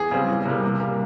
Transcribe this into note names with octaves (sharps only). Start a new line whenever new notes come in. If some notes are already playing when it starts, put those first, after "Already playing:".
Already playing: E2 G#4
C#3 G3 C4
E2
C3 G3 A#3
C3
G3 A#3